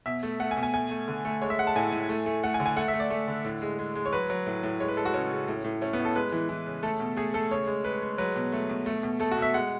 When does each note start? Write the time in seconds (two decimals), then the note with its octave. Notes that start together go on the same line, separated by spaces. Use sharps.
0.06 B2 E5
0.23 A3
0.40 A3 F#5
0.51 G#5
0.57 B2
0.63 G#5
0.74 A3 G#5
0.91 A3
1.08 D3
1.25 A3
1.41 G#3 C#5
1.50 E5
1.59 G#3 F#5
1.67 A5
1.76 A2 G#5
1.92 A2
2.09 A3
2.26 A3
2.43 A3 F#5
2.54 G#5
2.60 D3
2.66 G#5
2.76 A3 F#5
2.88 E5
2.93 A3
3.00 D5
3.10 A3
3.28 D3
3.45 A2
3.62 G#3
3.79 G#3
3.95 G#3
4.06 C#5
4.13 F#3 B4
4.30 F#3
4.47 A2
4.63 A2
4.80 G#3 C#5
4.88 B4
4.97 G#3 A4
5.05 F#4
5.14 C#3 C#4
5.31 C#3
5.48 A2
5.64 A2
5.81 A3 C#4
5.93 B3
5.99 A2
6.05 A4
6.15 G#3 B4
6.32 E3
6.49 E3
6.66 C#3
6.83 A3 A4
7.00 B2
7.16 A3 G#4
7.34 A3 A4
7.51 C#3 C#5
7.67 G#3
7.84 G#3 B4
8.02 G#3
8.18 F#3 B4
8.36 B2
8.52 A3
8.69 B2
8.86 A3
9.03 B2
9.20 A3 A4
9.31 F#4
9.37 B2 E5
9.54 G#3 F#5